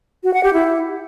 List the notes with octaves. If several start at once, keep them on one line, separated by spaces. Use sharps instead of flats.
F#4
F#5
G4
E4